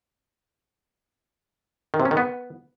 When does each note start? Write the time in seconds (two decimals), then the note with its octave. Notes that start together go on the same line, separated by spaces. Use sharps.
1.94 D#3
2.00 C3
2.05 C#4
2.11 D#3
2.17 B3